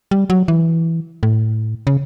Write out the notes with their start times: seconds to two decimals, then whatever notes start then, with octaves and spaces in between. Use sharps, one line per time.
0.11 G3
0.30 F#3
0.48 E3
1.23 A2
1.87 C#3